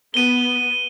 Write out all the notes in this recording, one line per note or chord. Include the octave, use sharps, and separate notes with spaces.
B3 D#7 G7